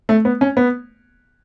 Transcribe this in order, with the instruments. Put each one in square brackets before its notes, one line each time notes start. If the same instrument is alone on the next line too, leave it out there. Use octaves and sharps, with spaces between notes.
[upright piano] A3
B3
C#4
B3